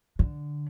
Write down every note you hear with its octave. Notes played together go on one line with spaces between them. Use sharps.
D3